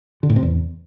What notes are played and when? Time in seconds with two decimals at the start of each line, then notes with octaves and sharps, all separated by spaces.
0.23 D3
0.30 A2
0.36 C3
0.43 E2